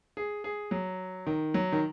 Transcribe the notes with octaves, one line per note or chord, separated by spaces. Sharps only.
G#4
G#4
F#3
D#3
F#3
D#3